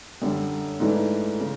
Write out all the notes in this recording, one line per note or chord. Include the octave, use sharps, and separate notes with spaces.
F#2 D3 G3
G#2 E3 A3 D4
C#3